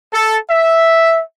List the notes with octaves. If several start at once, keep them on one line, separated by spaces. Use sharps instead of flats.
A4
E5